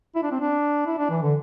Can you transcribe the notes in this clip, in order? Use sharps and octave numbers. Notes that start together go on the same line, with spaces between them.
E4
D4
C4
D4
E4
D4
E3
D3